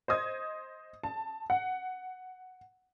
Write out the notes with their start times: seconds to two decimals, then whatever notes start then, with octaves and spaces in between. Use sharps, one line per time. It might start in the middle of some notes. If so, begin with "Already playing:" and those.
0.08 C5 D#5 D#6 G#6
1.03 A5
1.50 F#5